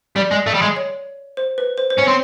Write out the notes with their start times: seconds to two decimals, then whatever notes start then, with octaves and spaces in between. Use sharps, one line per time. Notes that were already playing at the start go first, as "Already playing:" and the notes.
0.16 G3 D5
0.31 G#3
0.47 A3
0.54 G3
0.62 G#3
0.76 C#5
1.37 C5
1.58 B4
1.78 C5
1.90 C5
1.98 C#4 C#5
2.07 C4